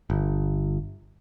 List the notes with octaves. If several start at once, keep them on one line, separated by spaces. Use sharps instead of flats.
G1